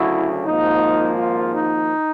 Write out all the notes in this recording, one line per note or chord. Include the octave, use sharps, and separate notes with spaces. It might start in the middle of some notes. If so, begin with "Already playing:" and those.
Already playing: D2 C#3 F#3 E4
G#1 G#2 F3 A#3 D#4
F4
D#4